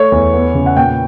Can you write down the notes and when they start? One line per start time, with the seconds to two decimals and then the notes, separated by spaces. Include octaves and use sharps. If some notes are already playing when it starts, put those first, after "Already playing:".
Already playing: A3 C#5
0.12 E2
0.33 B3
0.54 C#3
0.66 F#5
0.76 A#2 G5